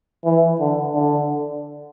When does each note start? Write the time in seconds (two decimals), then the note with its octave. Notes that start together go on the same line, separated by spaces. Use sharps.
0.25 E3
0.60 D3
0.95 D3